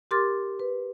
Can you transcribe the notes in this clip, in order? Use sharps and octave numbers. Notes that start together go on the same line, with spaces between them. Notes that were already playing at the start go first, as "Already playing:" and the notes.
G4 A#4 C6 D6 F6 A6
B4